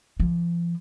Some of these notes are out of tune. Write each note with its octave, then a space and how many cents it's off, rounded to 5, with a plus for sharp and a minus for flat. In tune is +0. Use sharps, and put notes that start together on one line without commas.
F3 -35